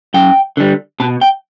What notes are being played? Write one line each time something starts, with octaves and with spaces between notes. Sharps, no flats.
F#2 G5
D3 G3
B2 A5
G5